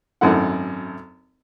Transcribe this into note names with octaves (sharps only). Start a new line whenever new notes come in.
G#1 F#2 A3 E4 F#5